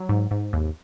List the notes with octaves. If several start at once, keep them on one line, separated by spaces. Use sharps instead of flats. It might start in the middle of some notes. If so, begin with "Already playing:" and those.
Already playing: F#3
G#2
G#2
D#2